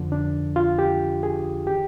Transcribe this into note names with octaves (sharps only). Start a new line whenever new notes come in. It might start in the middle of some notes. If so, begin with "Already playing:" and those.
Already playing: F2 D3 F3
D4
F4
G4
G#4
D#3 G4